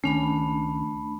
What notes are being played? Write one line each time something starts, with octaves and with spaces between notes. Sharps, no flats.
C#2 D#3 A3 C#4 D4 B5